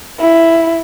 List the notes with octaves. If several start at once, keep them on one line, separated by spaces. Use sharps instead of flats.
E4